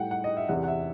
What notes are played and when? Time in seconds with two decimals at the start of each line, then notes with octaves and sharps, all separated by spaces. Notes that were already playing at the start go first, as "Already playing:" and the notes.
Already playing: A2 G3 F#5 G5
0.11 F#5
0.24 D#5
0.37 E5
0.49 E2 C3 E3 F#5
0.63 F#5
0.68 E5